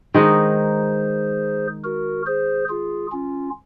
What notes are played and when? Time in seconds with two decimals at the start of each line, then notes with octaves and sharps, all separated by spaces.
0.14 D#3 G#3 D#4 G#4 C5
1.84 F#4 A#4
2.26 G#4 C5
2.69 F4 G#4
3.12 C#4 F4